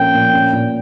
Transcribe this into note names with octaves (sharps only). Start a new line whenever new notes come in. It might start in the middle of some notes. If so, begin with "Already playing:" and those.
Already playing: A#2 F3 A#3 C#4 G5
A#2
C#4
A#2